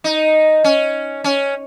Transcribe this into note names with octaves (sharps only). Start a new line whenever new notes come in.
D#4
C#4
C#4